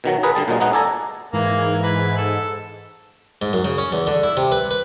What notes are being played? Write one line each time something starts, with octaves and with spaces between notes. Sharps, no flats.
B2 D#3 F#3
G#4 A#4 B4
D3 G3 A5
A#2 F#3 G#3 D#4
G#3 B3 D#4 F#5
A4 D5 G#5 A#5
G#2 E3 A#3 G#6
B4
A4
G#2
F#2
C#3
C#4
E2
D3
E4
C3
B4
B4